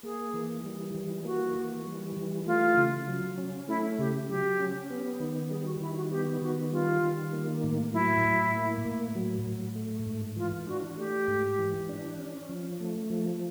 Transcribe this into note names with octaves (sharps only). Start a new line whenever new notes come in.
A#3 G#4
E3
G3
E3
A#3 F#4
E3
G3
E3
A3 F4
C#3
F#3
C#4
A3 E4
C#3 G4
F#3 G4
C#4
B3
D#3
G3 G#4
F#4
D#3 E4
F#4
B3 G4
D#3 F#4
G3 F4
D#3
A#3
A2
F#3 E4
A2
A#3
A2
F#3
A2
A3
G#2
E3 F4
D4 F#4
A3 G4
G#2
E3
D4
C#4
F3
A3
F3